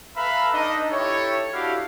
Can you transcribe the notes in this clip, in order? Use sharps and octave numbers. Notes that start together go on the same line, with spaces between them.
A4 B4 E5 F5 A#5 B5
D4 D#4 D#5
E4 G4 A4 C#5
D4 E4 F#4 G4 F5